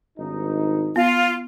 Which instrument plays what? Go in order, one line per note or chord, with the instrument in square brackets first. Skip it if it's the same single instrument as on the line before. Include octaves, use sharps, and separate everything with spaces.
[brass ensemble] G#1 G2 D#4
[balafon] B3 [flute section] F4